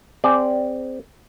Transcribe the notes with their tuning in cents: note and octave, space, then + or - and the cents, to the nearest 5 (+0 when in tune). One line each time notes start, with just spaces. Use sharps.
C4 -10 G#4 +0 D5 +0